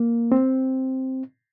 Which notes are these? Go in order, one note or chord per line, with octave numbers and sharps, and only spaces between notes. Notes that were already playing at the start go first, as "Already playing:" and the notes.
Already playing: A#3
C4